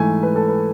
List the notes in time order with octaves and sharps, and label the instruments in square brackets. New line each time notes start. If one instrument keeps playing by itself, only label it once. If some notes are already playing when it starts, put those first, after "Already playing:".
Already playing: [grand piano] G#2 E3 A3 G#5
B4
A4
B4